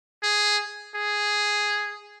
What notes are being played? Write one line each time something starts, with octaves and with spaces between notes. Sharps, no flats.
G#4
G#4